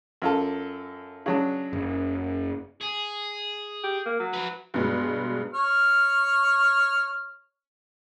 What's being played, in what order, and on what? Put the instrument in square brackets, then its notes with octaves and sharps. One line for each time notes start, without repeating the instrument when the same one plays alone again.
[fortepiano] F#2 F4 A4
C#3 F#3 D4
[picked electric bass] F#1
[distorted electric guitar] G#4
[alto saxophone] G4
A#3
F#3
[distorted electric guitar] F3 B4
[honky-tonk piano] G2 B2 F#3 G#3
[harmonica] C#5 F6